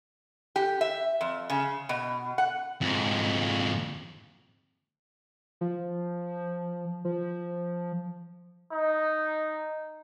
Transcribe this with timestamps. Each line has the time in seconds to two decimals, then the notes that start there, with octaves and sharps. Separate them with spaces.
0.56 G4
0.81 E5
1.21 F2
1.50 C#3
1.89 B2
2.38 F#5
2.81 F2 G#2
5.61 F3
7.05 F3
8.73 D#4